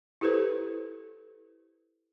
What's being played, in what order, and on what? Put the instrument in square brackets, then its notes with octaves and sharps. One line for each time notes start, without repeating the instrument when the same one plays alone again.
[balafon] E4 G4 A4 B4 C5